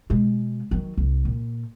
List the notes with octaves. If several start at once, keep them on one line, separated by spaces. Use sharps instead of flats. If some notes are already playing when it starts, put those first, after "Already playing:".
B2 G#3
D#3 F#3
C2
A#2